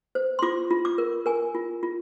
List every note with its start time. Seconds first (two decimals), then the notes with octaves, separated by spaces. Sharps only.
0.15 C5
0.39 C6
0.42 F4 D6
0.70 F4
0.85 D6
0.98 A#4
1.26 A#4 G#5
1.55 F4
1.83 F4